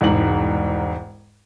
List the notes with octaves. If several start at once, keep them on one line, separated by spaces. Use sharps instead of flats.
E1 C2 G#2 F#7